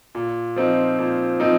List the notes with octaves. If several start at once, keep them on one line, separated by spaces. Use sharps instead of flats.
A#2
F3 C4 D#4
A#2
F3 C4 D#4